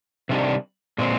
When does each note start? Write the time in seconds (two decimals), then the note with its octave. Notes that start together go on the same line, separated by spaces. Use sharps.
0.29 C3 D#3 G3 D4
0.98 A#2 G#3 C4